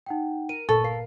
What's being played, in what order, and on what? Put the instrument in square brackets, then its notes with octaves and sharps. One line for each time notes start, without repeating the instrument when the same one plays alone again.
[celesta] D#4 F#5 G5
[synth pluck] A#4 [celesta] D#7
[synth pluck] G1 A#2 B4 [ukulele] A4 [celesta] C#6
[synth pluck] A#4 [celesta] F5 C7